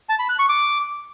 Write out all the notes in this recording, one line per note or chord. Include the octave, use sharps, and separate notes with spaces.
A5
B5
F#6
C#6
D6